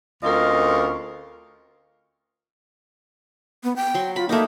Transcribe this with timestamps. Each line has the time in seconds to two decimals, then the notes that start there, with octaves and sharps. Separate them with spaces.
0.24 D2 C4 C#4 F4 A#4 D#5
3.64 B3
3.76 G5
3.94 F#3 C6
4.16 F4 B5
4.29 A3 A#3 D#4